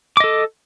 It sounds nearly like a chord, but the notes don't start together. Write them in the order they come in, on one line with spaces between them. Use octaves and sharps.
D6 D#5 A4